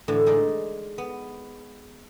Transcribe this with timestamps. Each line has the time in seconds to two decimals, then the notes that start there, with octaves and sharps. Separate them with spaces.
0.08 A2 D3 E3 E4
0.26 G#3 D#4 D5
0.98 B3